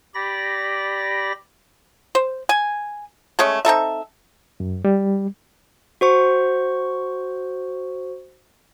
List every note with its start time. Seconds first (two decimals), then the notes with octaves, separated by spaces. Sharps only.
0.15 G4 D5 B5 A#6
2.15 C5
2.49 G#5
3.39 G#3 A3 C#4
3.65 C4 D#4 A4 E5
4.60 F#2
4.85 G3
6.01 F#4 C5 C#6